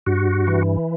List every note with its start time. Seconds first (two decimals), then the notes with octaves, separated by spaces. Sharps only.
0.06 G2 F#4
0.47 E3